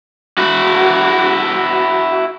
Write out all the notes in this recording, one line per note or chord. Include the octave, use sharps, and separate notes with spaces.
E4 F#4